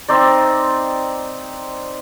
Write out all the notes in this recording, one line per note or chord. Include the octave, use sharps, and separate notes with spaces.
C4 D#4 D5